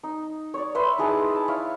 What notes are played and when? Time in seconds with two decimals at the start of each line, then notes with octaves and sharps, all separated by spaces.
0.03 D#4
0.54 C#5 D5
0.75 B4 E5 B5 C6
0.98 D#4 E4 G#4 A5
1.36 A5
1.48 E4 C#5 E5 F5